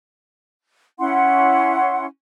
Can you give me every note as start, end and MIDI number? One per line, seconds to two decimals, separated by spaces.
0.99 2.05 61
0.99 2.05 64
0.99 2.05 78
0.99 2.05 84